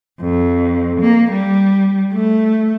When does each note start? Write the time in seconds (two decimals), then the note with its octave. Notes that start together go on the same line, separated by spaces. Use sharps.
0.21 F2
1.01 A#3
1.31 G3
2.13 A3